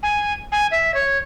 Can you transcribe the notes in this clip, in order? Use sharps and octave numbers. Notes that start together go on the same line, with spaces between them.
G#5
G#5
E5
C#5